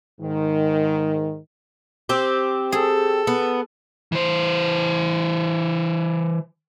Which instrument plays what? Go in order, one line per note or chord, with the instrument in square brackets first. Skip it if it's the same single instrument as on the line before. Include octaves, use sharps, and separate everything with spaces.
[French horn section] G#2 D#3
[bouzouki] C4 G4
[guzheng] G#4 [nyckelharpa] A4
[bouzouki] B3
[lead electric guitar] E3 C5